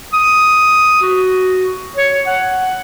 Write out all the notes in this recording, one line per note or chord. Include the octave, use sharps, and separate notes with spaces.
D#6
F#4
C#5
F#5